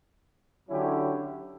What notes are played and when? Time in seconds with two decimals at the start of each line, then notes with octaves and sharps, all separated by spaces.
0.68 D3 F#3 C#4 E4 G4